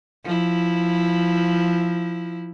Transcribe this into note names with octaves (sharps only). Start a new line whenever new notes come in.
F3 E4